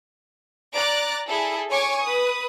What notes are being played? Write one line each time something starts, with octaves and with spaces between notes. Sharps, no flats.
D5 A#5 D6 F#6 A6
E4 G#4 A4
C#5 G#5 C#6 D6
B4 D#6